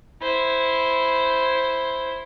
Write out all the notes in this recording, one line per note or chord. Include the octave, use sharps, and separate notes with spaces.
E4 C5